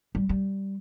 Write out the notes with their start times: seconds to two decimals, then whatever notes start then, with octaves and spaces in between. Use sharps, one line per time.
0.15 G3
0.29 G3